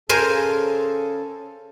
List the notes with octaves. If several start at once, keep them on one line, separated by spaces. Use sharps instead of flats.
C#3 A4 A#4 C5 G#5